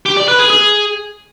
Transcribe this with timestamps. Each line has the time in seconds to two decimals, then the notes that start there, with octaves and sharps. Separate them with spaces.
0.06 G4
0.17 D5
0.28 B4
0.39 G#4
0.50 G#4